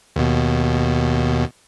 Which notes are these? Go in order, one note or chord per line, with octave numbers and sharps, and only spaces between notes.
D#2 B2